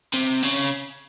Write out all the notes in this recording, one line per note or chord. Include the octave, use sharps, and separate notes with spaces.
C3
C#3